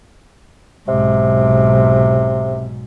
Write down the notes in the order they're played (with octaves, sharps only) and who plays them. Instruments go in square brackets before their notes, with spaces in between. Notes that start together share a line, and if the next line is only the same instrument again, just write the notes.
[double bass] B1 G#2 [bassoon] C3